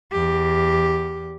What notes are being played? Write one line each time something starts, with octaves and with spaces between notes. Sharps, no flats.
E2 G4